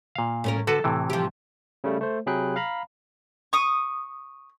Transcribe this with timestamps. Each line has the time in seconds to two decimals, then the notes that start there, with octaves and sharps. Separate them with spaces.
0.15 A#2 F5
0.44 A2 C#4 A#4
0.67 D3 F#4 A4 B4
0.84 A2 C3 E3
1.10 F3 G4
1.84 C#3 G3 A3
2.01 A3 C5
2.26 C3 F#3 G#4 G5 B5 F#6
2.56 F5 A#5 B5
3.53 C#6 D#6